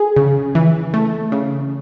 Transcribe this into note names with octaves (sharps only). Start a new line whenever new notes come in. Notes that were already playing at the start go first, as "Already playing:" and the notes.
Already playing: G#4
C#3
E3
A3
C#3